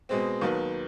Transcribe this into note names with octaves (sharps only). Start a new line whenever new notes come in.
B2 G#3 C4
D#2 D#3 F#3 B3